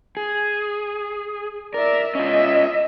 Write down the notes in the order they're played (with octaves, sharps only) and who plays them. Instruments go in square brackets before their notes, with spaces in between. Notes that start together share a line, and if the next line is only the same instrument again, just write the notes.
[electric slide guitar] G#4
[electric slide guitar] A#4 [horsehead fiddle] D5 E5
[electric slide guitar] C#4 F4 [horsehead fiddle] D#5 E5